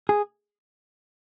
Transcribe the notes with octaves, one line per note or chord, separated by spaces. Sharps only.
G#4